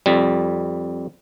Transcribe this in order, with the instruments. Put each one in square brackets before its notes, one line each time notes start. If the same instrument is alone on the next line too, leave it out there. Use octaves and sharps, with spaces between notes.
[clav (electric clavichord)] F2 G3